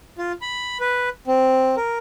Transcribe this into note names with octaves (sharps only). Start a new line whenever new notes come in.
F4
B5
B4
C4
A#4